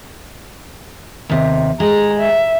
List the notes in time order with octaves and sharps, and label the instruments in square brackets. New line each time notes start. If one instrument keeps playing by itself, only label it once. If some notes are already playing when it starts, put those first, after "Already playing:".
[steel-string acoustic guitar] D#2 C3
[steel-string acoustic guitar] G#3 [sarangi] A#5
[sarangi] E5